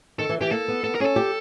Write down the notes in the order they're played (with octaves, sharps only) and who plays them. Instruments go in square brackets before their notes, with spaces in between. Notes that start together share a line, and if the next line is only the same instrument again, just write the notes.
[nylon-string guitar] D#3 [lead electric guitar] A4
[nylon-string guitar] E3
[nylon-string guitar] E3 [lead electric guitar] G4
[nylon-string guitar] A#3 [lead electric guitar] A4
[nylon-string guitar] B3
[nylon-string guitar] B3 [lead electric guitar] A4
[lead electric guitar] A#4
[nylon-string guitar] C#4 [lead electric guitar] G#4
[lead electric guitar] A4
[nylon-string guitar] G4